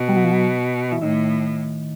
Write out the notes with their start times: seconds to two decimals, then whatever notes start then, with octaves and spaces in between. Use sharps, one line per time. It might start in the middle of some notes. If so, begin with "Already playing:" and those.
Already playing: B2
0.09 G3
0.16 F#3
0.24 F3
0.31 F#3
0.92 E3
1.02 A2 D#3